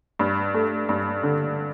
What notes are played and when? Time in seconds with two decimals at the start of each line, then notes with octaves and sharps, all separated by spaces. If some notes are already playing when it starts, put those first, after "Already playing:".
0.19 G2
0.54 A3
0.89 G2
1.23 D3